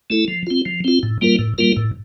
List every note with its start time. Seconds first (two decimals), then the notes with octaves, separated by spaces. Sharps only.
0.10 A3 E4 A4
0.28 F3
0.47 C4 F4
0.66 F3
0.84 C4 F4
1.03 A2
1.21 G3 A#3 F4 A#4
1.39 A2
1.58 G3 A#3 F4 A#4
1.76 A2